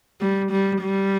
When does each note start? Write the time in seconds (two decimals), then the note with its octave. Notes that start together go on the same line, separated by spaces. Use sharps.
0.21 G3
0.52 G3
0.82 G3